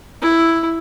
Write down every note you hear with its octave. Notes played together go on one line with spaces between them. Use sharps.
E4